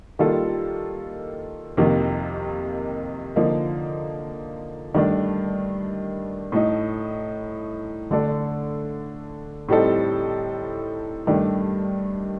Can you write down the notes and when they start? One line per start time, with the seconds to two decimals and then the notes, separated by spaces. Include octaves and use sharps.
0.19 D#3 G3 A#3 F4 A4
1.77 F2 C3 D#3 A#3
3.36 D3 F3 A#3 D#4
4.94 G2 D#3 A3 D4
6.52 A2 A3 D#4
8.11 D3 A3 D4 A4
9.69 A2 G3 C4 D#4 A4
11.27 G2 D#3 A3 D4 G4